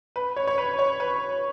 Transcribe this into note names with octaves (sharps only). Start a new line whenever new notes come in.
B4
C#5
C#5
B4
C#5
B4